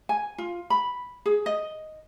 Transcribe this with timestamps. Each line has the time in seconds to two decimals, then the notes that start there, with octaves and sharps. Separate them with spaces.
0.09 G#5
0.38 F4
0.70 B5
1.26 G#4
1.46 D#5